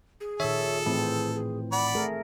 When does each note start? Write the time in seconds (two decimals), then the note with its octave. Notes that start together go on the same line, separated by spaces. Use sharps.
0.20 G#4
0.40 A#2 D#3 A4 C#5 E5
0.86 A2 E3 C4
1.34 G#4
1.72 D5 F#5 B5
1.95 A3 G#4 A#4